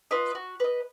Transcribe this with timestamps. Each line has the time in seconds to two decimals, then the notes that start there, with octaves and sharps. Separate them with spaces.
0.11 F4 B4 D#5
0.35 F#4
0.60 B4 D#5